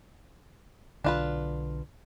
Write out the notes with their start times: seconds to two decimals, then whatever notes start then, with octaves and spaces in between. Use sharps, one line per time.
1.04 B1 D3 D4 F4 B4